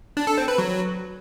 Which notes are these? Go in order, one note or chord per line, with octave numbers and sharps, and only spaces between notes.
D4
A4
C4
B4
F#3